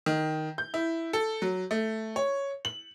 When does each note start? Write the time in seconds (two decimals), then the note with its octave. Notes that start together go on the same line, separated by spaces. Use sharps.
0.06 D#3
0.58 G6
0.74 E4
1.13 A4
1.42 F#3
1.71 A3
2.16 C#5
2.65 F#7